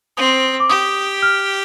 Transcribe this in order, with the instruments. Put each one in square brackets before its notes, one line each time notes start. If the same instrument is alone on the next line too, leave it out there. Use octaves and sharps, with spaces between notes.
[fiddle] C4 [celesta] D#6
[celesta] D6
[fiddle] G4 [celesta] D#6
[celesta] F6